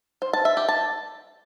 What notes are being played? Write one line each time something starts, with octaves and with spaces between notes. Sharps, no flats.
C5
A5
E5
G4
A5